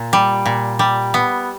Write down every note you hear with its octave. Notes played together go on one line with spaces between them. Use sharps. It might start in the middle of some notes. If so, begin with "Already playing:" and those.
Already playing: A#2
G3
A#2
G3
B3